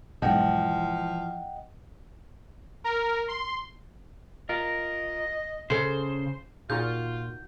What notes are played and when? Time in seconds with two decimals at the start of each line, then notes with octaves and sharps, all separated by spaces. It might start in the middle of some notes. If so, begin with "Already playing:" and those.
0.22 B1 G#2 E3 F3 D#5 F#5 G5
2.84 A#4
3.28 C6
4.49 F4 A#4 D#5
5.70 C#3 A4 C5
6.70 A#2 D#4 F4 F#4 G#4 G6